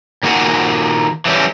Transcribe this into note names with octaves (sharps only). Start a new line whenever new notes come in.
A#2 D#3 A#3 F#4 F#5 G#5
E3 F#3 G3 C#4